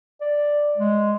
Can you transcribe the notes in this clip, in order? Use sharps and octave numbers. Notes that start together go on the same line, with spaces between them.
D5
G#3